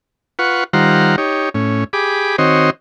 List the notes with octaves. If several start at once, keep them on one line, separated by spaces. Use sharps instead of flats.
F4 B4 F#5 C#6
D#3 G3 F4 C5 F#5 A#5
D#4 G4 C#5
A2 C#4
G4 G#4 B5 D6
D#3 C4 F#4 C5 C#5 D#5